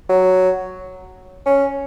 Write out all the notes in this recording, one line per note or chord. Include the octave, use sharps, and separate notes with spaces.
F#3
C#4